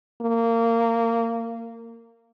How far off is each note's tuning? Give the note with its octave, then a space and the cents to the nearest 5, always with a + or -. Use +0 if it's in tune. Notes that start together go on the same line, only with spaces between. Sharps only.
A#3 -20